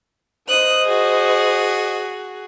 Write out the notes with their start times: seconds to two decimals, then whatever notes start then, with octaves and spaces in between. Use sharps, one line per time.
0.48 C5 D#5 D#6 F#6
0.86 F#4 G#4